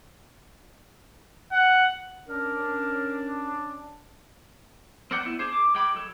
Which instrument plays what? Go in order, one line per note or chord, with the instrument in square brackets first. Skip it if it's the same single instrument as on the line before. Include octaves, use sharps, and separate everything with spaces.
[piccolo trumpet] F#5
[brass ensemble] C#4 D4 [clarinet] A#4
[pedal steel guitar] C4 A#4 D5 F#5 G5
B3 E4
D4 G#4 C5
D6
G#3 G5 B5 D6
F#3 A4 C#5